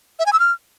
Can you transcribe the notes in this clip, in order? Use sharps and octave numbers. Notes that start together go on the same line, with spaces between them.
E5
G#5
E6
F6